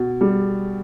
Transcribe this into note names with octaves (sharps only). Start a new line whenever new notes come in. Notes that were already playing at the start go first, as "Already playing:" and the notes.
Already playing: B2
G3